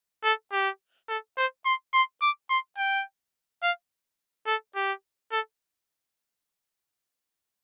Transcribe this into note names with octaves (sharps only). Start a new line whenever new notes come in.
A4
G4
A4
C5
C6
C6
D6
C6
G5
F5
A4
G4
A4